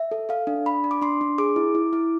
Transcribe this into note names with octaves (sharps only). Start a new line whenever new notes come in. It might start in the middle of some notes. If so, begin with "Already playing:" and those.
Already playing: E5
A4
A4 F5
D4
D4 B5
D4
D6
D4 C6
D4
G#4 D6
E4
E4
E4